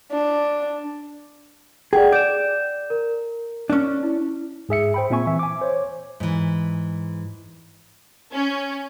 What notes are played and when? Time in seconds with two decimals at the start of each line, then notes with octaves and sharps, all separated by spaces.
0.12 D4
1.93 G#4 D5 F#5 G5
2.12 D5 G6 E7
2.90 A#4
3.70 C#4 D4
4.03 E4
4.69 G#2 G#4 E5 C#7
4.94 C5 G5 B5
5.10 A#2 C4 E5 G#5 C#6
5.27 E3 E5
5.39 G#5 D6
5.61 C5 C#5
6.20 G#2 E3
8.32 C#4